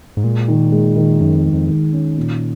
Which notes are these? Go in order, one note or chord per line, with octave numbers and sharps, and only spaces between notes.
G#2
A#2 G#3
D#3
G#3
D#3
F#2 D#3
F2
G#3
F2
D#3
C#4
A#2